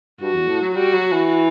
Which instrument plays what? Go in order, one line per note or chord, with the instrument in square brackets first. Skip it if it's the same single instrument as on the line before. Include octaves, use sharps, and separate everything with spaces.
[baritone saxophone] G2 [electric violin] F#4
[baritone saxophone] E2
A2
F#3
[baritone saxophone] G3 [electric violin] F#4
[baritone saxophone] F#3
E3